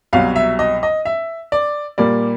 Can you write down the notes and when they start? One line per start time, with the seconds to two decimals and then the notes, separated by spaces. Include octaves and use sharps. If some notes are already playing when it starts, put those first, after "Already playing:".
0.13 C2 B2 F#3 F5
0.36 E5
0.59 D#5
0.83 D#5
1.05 E5
1.52 D5
1.98 A#2 G3 A#3 D5